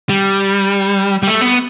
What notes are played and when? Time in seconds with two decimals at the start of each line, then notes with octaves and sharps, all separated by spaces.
0.09 G3
1.23 G3
1.27 A3
1.41 B3